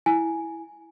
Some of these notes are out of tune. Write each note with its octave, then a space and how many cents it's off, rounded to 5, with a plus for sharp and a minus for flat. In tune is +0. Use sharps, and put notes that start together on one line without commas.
E4 +0 G#5 +5